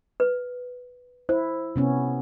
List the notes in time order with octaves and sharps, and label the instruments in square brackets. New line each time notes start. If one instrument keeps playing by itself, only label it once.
[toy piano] B4
[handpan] E4 [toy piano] C5
[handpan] C3 B3 C#4